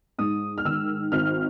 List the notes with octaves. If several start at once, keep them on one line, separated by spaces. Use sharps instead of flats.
G#2 D#6
F6
D#3 E6
G#1 F6